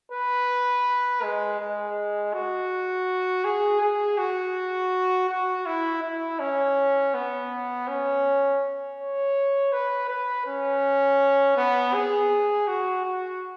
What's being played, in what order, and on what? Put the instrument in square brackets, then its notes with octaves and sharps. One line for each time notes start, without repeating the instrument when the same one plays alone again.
[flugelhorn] B4
G#3
G#3
F#4
G#4
G#4
F#4
F#4
E4
E4
C#4
B3
C#4
C#5
B4
B4
C#4
B3
G#4
F#4
F#4